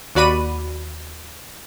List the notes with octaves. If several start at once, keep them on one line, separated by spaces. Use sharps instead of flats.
D#2 F#4 D5 B5 D#7